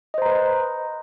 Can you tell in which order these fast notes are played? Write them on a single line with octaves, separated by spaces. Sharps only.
D#5 C5 A#5 B4